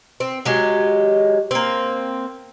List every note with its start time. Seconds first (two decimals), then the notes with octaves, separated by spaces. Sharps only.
0.20 C4
0.45 F#3 G#3 G4
1.51 A#3 C4